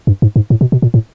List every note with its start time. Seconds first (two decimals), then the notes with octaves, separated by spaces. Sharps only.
0.07 G2
0.22 G#2
0.36 G#2
0.50 A2
0.61 B2
0.72 B2
0.82 A#2
0.94 A2